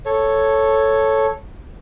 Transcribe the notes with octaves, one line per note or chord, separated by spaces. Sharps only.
A4 C#5